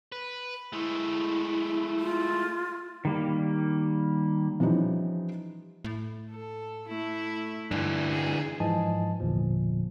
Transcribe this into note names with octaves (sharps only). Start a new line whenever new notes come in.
B4
G#3 A3 E4
F4
D#3 G3 A#3
E3 F3 G3 C#4 D#4
A2
A4
A3 E4
G2 D3 E3
G#4
G#2 E3 F3 D#5 G#5 A5
G1 E2 A#2 F3